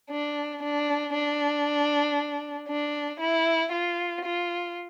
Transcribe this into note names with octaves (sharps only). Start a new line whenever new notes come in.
D4
D4
D4
D4
E4
F4
F4